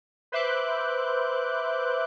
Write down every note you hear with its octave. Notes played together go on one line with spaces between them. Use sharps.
B4 C5 E5 D6 F#6 G6